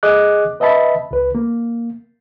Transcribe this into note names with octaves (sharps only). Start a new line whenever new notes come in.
G#4 D#5 D6 F#6
B4 D#5 E5 A5 B5
C#2 B4
A#3